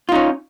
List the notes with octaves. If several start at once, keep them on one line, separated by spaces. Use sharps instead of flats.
C#4 D#4 F4